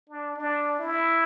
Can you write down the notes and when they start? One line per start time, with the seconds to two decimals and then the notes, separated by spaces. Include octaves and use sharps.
0.09 D4
0.37 D4
0.79 E4